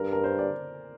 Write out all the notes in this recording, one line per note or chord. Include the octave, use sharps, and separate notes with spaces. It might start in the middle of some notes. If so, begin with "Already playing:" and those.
Already playing: G2 A#4
A#4
C5
D5